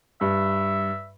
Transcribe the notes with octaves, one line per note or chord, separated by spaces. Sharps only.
G2 E5